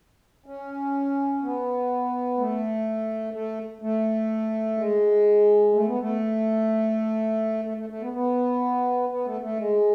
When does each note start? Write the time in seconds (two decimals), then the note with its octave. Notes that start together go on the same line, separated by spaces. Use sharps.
0.46 C#4
1.42 B3
2.38 A3
3.34 A3
3.82 A3
4.77 G#3
5.73 A3
5.86 B3
5.99 A3
7.65 A3
7.77 A3
7.89 A3
8.01 B3
8.13 B3
9.09 B3
9.25 A3
9.41 A3
9.57 G#3